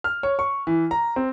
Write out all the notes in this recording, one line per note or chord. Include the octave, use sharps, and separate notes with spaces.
F6
C#5
C#6
E3
A#5
C4